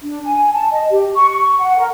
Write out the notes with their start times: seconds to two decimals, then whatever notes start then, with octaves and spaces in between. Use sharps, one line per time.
0.02 D4
0.24 G#5
0.52 A5
0.71 D#5
0.90 G4
1.15 C#6
1.30 C#6
1.59 F#5
1.77 A#4